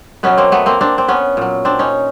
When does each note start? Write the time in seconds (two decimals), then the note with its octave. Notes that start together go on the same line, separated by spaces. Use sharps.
0.23 B2 F#3 B3 C#4
0.38 A#3 C4
0.52 A3 B3
0.66 A#3 C4
0.81 C4 D4
0.98 C4
1.08 B3 C#4
1.37 A#2 F#3
1.65 C4 D4
1.79 C#4 D#4